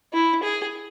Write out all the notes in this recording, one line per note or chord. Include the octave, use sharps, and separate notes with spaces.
E4
G#4